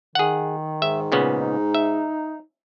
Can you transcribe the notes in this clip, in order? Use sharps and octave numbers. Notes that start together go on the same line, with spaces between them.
D#3 G#4 F#5
G#2 E5
A#2 C#3 B3
D#4
E5